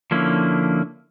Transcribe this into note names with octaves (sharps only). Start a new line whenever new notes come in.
D3 F3 A#3 C#4 E4